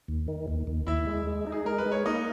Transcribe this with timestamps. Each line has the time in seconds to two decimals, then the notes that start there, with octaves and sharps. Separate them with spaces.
0.08 D#2
0.28 D#3
0.48 D#2
0.67 D#2
0.87 D#2 E4 E5
1.07 G#3
1.27 G#3
1.47 D#4
1.52 G#4
1.66 G#3 A#4
1.78 B4
1.86 G#3
1.92 C#5
2.06 A#3 D#4 D#5